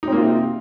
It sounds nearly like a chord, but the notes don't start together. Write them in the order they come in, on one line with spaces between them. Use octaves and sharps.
D#4 C4 A#3 F4 C3